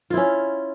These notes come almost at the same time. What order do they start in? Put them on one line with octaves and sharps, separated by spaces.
F4 E4 C#4